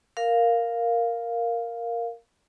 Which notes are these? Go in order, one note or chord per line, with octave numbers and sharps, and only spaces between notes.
A#4 F5